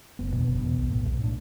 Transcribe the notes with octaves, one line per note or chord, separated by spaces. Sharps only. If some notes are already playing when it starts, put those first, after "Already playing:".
F#1 B3
E2 B2 B3 D4
F#1 B3
E2 B2
B1
A2
B1 A3
A2 D4